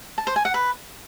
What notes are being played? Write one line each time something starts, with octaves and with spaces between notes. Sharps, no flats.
A5
C5
G#5
F#5
B4